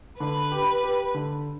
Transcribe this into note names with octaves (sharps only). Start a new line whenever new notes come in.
D3 B4
G4
G4
D3